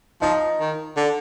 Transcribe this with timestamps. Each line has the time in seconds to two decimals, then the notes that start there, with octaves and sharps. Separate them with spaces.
0.22 F3 D#4
0.60 D#3
0.97 D3